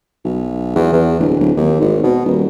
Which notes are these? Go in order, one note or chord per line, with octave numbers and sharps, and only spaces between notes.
B1
E2
E2
D1
D1
D#2
G#1
B2
D#1